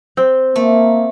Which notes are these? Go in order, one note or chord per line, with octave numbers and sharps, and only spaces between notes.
C4 G5
A3 A#3